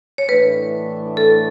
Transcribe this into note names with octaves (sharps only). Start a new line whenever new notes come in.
C#5
A2 E3 A3 D4 B4
A4